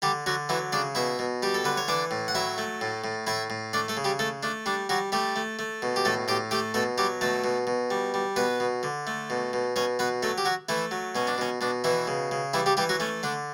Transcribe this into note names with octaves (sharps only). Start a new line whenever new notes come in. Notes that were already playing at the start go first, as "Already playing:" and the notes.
D3 G3 G4
D3 F#3 F#4
E3 F#3 E4
C#3 D4 D5
B2 E4 E5
B2
G3 G4
A4
D3 B4
C#5
E3 D4 D5
A2
F#5
F#3 E4 E5
A3
A2
A2
A2 E4 E5
A2
A3 D4 D5
A3 A4
C#3
G3 G4
A3 A4
A3 D4
G3 D4
F#3 G3 F#4
G3 A3 G4
A3
A3
B2
G4
A2 A3 A4
A2 G4 G5
A3 G4 G5
B2 A3 A4
F#3 G3 G4
B2 A3 A4
B2
B2
G3
G3
B2 B3 B4
B2
D3
A3
B2
B2
B2 C#4 C#5
B2 B3 B4
F#3 A3 A4
G4
F#3 F#4
E3 A3 E4
F#3
B2 C#4
D4
B2 C#4
B2 D4
B2 E3 E4
C#3
C#3
E3 G3 E4
G3 G4
E3 G3 G4
F#3 F#4
A3 C#4
D3 D4